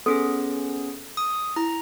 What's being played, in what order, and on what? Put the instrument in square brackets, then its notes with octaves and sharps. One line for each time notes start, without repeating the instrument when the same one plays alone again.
[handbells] B3 C#4 G#4 [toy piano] A4
[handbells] D#6
[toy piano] E4 [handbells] A#5